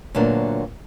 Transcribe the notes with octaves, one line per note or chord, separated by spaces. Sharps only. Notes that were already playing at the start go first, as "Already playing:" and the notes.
D2 A#2 F#3 B3 D4 A#4